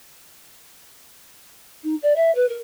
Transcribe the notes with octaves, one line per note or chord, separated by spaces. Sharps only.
D#4
D5
E5
B4
A#4